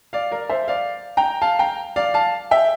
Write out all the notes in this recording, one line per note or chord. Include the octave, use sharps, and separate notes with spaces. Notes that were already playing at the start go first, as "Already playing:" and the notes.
D5 F5
A#4 D5
C5 E5
D5 F5
G5 A#5
F5 A5
G5 A#5
D5 F5
F5 A5
E5 G5